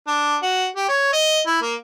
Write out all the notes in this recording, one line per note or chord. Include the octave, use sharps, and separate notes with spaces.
D4
F#4
G4
C#5
D#5
E4
A#3